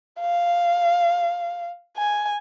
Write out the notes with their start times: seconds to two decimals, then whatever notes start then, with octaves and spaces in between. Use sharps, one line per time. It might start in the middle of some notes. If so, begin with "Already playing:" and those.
0.20 F5
1.97 G#5